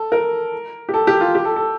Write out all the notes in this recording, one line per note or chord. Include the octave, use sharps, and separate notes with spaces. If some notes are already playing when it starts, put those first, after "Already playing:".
Already playing: A4
A#4
G4
A4
G4
F4
G4
A4
A4